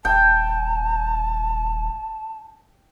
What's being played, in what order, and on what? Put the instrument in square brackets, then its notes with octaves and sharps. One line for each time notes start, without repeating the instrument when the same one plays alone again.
[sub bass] D#1 [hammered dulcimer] G5 [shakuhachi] A5